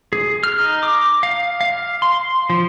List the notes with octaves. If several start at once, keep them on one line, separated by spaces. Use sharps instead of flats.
G#4
F6
D#4
D6
F5
F5
C6
F3